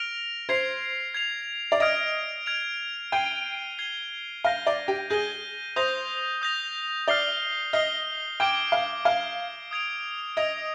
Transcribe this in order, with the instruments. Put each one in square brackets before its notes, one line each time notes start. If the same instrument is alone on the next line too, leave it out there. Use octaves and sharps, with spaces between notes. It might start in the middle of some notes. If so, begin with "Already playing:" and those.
Already playing: [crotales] F6 A#6 D7 F7
[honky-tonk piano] C5 [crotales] G#6 C7 F7
[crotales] G#6 C7 F7
[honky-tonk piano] D5
[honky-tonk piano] D#5 [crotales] F6 G#6 D7 F7
[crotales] F6 G#6 D7 F7
[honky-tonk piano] G5 [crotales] G#6 C7 D#7 G7
[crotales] G#6 C7 D#7 G7
[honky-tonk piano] F5 [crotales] G6 A#6 D#7 G7
[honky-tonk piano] D5
G4
[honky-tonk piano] G#4 [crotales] G6 A#6 D#7 G7
[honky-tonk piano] C5 [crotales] D#6 G6 A#6 F7
[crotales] D#6 G6 A#6 F7
[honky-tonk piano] D5 [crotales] F6 C7 G7
[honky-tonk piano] D#5 [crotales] F6 C7 G7
[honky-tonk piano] G5 [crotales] D6 F6 G#6 D7 G7
[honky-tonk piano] F5
[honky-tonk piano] F5 [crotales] D6 F6 G#6 D7 G7
[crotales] D#6 G#6 D7 F7
[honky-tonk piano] D#5 [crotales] D#6 G#6 D7 F7